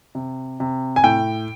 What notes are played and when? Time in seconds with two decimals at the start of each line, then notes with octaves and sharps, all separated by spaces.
0.15 C3
0.60 C3
0.96 G#5
1.04 A2 G5